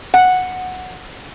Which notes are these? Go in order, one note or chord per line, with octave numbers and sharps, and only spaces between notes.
F#5